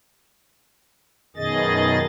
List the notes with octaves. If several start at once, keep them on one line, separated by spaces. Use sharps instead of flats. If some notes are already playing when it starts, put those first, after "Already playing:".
F#2 B2 D#3 G#4 D#5 A6